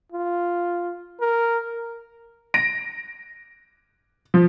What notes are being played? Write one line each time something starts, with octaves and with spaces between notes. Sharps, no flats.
F4
A#4
A#6 D7
F3